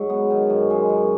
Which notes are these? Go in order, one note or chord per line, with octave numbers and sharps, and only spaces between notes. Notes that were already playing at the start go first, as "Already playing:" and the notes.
Already playing: G#2 F#3
B3
D#3
F#2
G#3
F#2